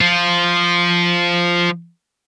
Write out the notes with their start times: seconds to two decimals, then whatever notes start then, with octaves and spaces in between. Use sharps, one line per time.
0.01 F3 F4